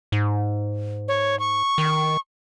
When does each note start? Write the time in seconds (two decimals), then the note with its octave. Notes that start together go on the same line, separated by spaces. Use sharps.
0.12 G#2
1.08 C#5
1.40 C#6
1.78 D#3